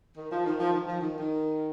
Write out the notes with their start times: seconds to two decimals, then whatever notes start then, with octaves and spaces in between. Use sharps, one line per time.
0.17 D#3
0.30 F3
0.45 D#3
0.59 F3
0.72 D#3
0.86 F3
1.00 D#3
1.17 D#3